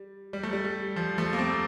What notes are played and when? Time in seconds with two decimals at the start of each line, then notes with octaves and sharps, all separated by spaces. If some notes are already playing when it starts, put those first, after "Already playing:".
Already playing: G3
0.33 G3
0.43 A3
0.53 G3
0.64 G3
0.96 F3
1.18 F3 A3
1.33 A#3
1.39 A3 C4